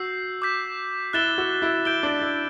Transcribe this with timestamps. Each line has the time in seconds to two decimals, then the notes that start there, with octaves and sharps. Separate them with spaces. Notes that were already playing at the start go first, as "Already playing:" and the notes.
Already playing: F#4 E6 G6 C7
0.42 D6 G6 B6
1.13 E4 F#6 A6 E7 G7
1.38 F#4
1.62 E4
1.85 E4 G6 D7 G7
2.03 D4
2.22 E4